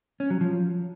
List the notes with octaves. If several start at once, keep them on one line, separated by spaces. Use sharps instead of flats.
C#4
F#3
F3